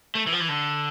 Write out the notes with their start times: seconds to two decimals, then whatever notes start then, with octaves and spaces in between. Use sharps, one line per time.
0.15 A3
0.27 E3
0.32 F3
0.40 E3
0.49 D3